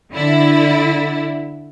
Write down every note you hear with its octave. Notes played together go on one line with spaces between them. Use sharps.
D3 E4